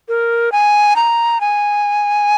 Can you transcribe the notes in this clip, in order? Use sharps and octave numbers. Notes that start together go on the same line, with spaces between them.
A#4
G#5
A#5
G#5